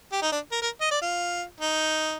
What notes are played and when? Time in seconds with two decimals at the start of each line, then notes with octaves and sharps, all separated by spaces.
0.12 G4
0.22 D#4
0.32 D4
0.52 A#4
0.62 A#4
0.81 D#5
0.91 D5
1.01 F4
1.60 D#4